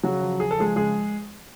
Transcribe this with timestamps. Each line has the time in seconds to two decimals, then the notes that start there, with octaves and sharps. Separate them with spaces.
0.04 C#3 F#3 F#4
0.22 F3
0.40 C#3 G#4
0.51 A4
0.58 F3 G#3 G#4
0.76 C#3 G#3 G#4